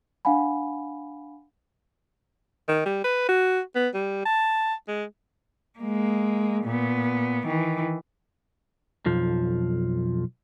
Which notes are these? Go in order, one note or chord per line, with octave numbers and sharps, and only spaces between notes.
D4 F5 F#5 G#5 B5
D#3
G3
B4
F#4
B3
G3
A5
G#3
G#3 A#3
A#2 B3
D#3 E3
B1 F2 F3